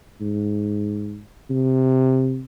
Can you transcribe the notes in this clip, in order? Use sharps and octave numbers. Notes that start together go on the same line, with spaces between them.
G#2
C3